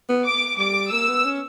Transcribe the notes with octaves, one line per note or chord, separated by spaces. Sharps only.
B3
D6
G3 D6
A#3 E6
B3
C#4